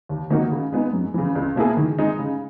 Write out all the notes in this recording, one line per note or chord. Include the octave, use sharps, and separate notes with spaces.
D#2
D#3 A#3 D#4 F#4
C#3
G#3 B3 D#4
F#2
C#3 E3
C#2
B2 A#3 E4 G#4
D#3
G#3 D#4
C#3